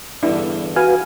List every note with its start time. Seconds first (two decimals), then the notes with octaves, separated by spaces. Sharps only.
0.23 E2 G2 D3 D4 E4
0.76 F#4 B4 F5 G#5